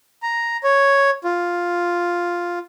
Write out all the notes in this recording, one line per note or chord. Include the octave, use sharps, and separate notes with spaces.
A#5
C#5
F4